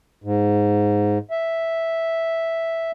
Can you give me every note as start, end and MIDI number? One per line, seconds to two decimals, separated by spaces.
0.24 1.18 44
1.31 2.91 76